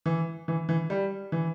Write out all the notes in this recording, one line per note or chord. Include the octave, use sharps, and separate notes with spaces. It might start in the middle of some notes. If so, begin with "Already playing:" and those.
E3
E3
E3
G3
E3